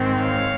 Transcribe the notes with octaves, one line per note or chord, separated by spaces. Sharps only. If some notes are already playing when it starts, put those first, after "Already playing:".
Already playing: G#2 D#3 G#3 C4
C#5 F5